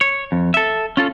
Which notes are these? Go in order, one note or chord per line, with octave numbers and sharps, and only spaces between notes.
C#5
F2
A4 E5
C#4 F4 A4